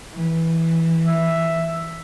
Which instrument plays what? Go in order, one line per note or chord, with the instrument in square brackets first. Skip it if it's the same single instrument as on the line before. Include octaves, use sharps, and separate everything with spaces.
[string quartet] E3
[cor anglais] E5